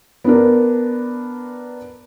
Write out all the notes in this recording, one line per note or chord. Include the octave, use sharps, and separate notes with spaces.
B3 D4 A#4